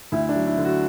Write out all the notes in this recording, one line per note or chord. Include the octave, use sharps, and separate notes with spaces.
D2 E4
D4
F#3
E4
D3
F#4